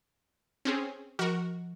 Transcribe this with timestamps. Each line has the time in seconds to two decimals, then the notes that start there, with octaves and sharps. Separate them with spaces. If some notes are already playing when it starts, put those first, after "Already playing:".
0.65 C4 C#4 G#4
1.19 F3 F#4 A#4